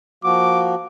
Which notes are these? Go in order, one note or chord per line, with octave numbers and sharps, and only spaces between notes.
F3 A#3 F#4 D6